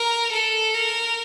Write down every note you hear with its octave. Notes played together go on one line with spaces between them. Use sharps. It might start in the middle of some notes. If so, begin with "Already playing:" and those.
Already playing: A#4
A4
A#4